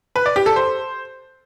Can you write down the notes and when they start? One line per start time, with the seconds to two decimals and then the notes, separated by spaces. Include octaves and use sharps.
0.16 B4
0.26 D5
0.36 G4
0.46 A4
0.56 C5